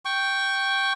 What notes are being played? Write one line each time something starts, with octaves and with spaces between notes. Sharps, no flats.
G5 C#6